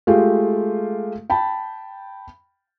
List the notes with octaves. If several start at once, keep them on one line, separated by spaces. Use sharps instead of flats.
G#3 A3 F4 G4
G5 A5 B5